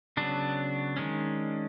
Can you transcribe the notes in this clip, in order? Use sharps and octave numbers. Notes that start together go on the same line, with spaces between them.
C#3 F#3 B3 D4
D#3 G#3 C#4